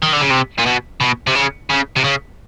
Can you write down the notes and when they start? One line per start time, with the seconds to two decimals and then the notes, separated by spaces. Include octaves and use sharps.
0.03 D#3
0.13 D3
0.21 C#3
0.31 C3
0.59 A#2
0.66 B2
1.01 B2
1.27 C3
1.35 C#3
1.70 C#3
1.96 C3
2.04 C#3